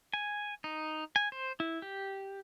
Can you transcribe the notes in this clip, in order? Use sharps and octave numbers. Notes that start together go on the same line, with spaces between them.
G#5
D#4
G#5
C5
E4
G4